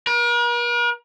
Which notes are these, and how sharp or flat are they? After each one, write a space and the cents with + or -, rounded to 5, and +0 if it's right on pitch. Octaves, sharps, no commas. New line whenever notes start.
A#4 +45